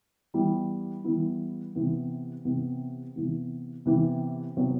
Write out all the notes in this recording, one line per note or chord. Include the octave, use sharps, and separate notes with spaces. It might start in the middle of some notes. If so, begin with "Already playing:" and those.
E3 G3 B3 E4
E3 G3 B3 E4
C3 E3 B3
C3 E3 B3
C3 E3 B3
C3 E3 B3
C3 F#3 B3